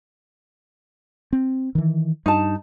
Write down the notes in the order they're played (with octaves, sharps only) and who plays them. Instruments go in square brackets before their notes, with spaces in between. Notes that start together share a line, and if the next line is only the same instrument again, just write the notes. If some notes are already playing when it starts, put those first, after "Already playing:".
[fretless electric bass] C4
D#3 E3
[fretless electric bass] G2 [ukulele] D#4 A5